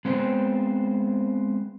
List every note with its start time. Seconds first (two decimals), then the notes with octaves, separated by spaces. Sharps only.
0.05 G#3 B3 C4 C5